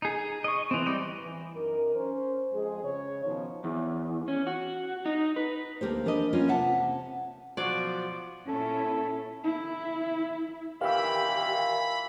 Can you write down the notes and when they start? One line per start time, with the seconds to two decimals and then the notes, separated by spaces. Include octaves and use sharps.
0.02 D#4 G#4
0.44 D#5 C#6
0.71 E3 C4
0.86 G3 D5 D#5 G5
1.22 E3
1.55 F#2 D#4 A#4
1.95 C#4 C5
2.53 F2 G#3 G#4
2.83 C#3 C#5
3.24 B2 D#3 F3 C#4 D#4
3.64 E2
4.28 C#4
4.47 F#4
5.05 D#4
5.36 B4
5.81 D2 A#3 G4 C5
6.05 E3 D4 A#4 B4 D#5
6.33 A#3 B3 C#4 F4
6.48 C3 E5 F#5 A5
7.57 B2 F3 F#3 F#4 C5 D5
8.48 A#2 C#4 E4 A4
9.44 E4
10.81 A#2 D#3 E3 G4 F5 B5 E6